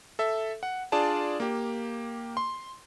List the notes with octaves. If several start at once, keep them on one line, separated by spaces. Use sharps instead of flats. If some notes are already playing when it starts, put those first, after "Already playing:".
A4 E5
F#5
D4 F4 G#4 D5 A5
A#3 G4
C6